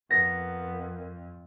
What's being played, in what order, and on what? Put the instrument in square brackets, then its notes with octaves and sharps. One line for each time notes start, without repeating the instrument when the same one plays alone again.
[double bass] F2 [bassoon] B3 [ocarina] A#4 [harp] A#6